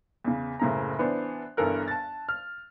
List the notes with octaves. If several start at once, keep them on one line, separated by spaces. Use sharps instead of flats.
E2 C#3
F#1 A2 C#3 C4 A#5
E3 B3 D4 C5
G1 G2 E3 A4 A#4 F#6
A5 A6
F6